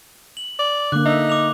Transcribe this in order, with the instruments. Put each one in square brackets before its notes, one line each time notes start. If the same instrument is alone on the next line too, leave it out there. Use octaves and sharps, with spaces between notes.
[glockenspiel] F#7
[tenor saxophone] D5
[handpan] D3 A#3 [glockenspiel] D6 F#6
[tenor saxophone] D#4 [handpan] E5
[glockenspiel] D6 F7